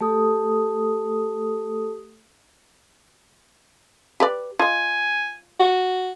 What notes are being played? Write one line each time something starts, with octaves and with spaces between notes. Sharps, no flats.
A3 G4 A4 D#6
G4 B4 D5
F4 D#5 G#5
F#4